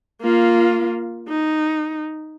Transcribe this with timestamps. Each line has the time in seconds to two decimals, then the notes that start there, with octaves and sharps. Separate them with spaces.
0.22 A#3 F4
1.29 D#4